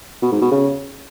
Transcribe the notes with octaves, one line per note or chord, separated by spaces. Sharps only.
B2
G#2
B2
C#3